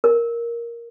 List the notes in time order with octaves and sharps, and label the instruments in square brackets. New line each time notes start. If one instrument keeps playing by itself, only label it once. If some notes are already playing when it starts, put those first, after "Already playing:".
[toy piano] A#4